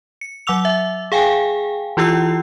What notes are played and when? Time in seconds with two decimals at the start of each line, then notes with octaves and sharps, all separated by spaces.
0.21 C#7
0.47 F#3 F#5 D6 E6 F7
0.65 E5
1.12 G#4 F5 G5 G#5
1.97 E3 E4 F4 G4 E6 C7